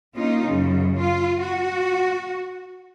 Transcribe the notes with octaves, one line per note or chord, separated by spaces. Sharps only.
A#3 C#4 D#4 F4
F#2 C#3
F4
F#4